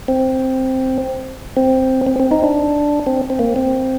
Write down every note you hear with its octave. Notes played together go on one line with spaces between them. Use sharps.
C4
C4
C4
C4
D#4
D4
C4
C4
A#3
C4